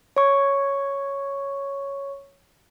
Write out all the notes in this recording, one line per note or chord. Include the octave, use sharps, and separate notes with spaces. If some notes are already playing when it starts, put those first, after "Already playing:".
C#5 C#6